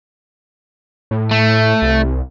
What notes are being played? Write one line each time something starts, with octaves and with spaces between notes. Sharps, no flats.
A2
A3
C2